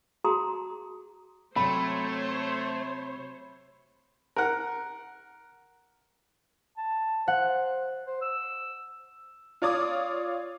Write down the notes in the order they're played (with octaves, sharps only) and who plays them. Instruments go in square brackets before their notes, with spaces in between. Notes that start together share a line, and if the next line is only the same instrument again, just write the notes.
[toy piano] F#4 G#4 A5 A#5 C6 D#6
[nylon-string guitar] C3 F#3 [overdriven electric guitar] A3 [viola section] C5 C#5 [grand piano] B5
[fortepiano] A#4 F#5
[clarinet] A5
[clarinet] C5 [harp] F#5
[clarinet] C5
E6
[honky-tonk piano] F4 C#5 D5 D6 D#6